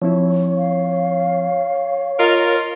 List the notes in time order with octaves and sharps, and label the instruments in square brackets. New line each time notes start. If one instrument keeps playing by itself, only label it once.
[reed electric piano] F3 C4 E4 [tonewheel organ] C#5
[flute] F5
[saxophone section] F4 A#4 [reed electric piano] D#5